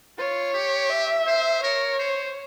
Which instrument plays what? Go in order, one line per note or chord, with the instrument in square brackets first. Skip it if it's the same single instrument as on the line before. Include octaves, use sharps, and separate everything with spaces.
[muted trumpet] F4 [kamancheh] C#5
[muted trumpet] G4
[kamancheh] E5
[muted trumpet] C5
[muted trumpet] A#4 [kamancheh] C#5
[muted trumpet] C5